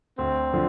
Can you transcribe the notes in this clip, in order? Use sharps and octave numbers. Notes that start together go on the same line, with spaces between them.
D2 C4
D3 F3